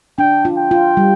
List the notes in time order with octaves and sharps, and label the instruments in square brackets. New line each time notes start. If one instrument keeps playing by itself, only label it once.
[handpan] D4 [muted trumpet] G5
[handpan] F4
[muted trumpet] G5
[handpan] F4
G3